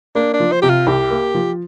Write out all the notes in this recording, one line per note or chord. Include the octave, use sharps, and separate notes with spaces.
A#3 D4
D4
F3
C5
C3 G4
F4
C2 G4
A#3
F3